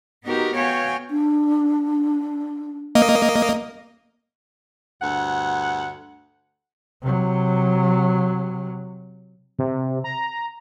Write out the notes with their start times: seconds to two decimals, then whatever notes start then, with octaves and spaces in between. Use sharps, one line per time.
0.24 B3 D#4 F#4 G4 A#4
0.55 B3 F#4 C#5 F5 G5 G#5
1.10 D4
2.95 A#3 D#5
5.02 D2 G2 F#5
7.02 C3 F#3
9.59 C3
10.04 A#5